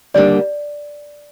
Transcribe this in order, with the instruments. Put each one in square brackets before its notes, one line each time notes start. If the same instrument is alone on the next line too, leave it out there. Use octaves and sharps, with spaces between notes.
[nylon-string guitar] D#2 D3 G3 A#3 D4 [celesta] D5